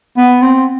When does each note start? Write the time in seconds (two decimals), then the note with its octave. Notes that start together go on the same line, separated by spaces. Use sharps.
0.17 B3
0.42 C4